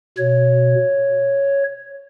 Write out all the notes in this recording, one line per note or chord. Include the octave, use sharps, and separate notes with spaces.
B2 C#5